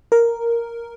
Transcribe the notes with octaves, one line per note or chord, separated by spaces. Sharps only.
A#4